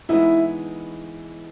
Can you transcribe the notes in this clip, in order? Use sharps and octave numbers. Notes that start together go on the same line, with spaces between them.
E3 G#3 B3 D#4 E4